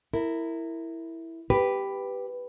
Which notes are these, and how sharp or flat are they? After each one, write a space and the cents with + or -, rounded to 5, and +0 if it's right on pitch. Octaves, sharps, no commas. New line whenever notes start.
E4 +0 A#4 -20
G4 +0 B4 +0